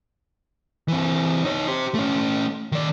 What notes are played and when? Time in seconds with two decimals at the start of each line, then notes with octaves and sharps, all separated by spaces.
0.88 E3 C4
1.45 D#4 C#5
1.68 G4 C5
1.95 A3 C#4
2.72 D#3 D5